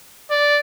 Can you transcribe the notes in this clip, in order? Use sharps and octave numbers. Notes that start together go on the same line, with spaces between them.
D5